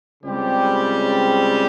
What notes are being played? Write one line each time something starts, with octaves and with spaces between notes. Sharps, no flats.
C#2 C#3 G3 C4 G4